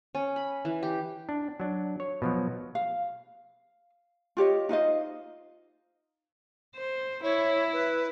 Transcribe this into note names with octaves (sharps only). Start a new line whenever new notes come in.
C#4
B5
E3
G4
D4
F#3 D4
C#5
B2 F3 F#3
F5
F4 G4 C#5 D#5
D#4 F4 C5 D#5
C5
E4 C#5
B4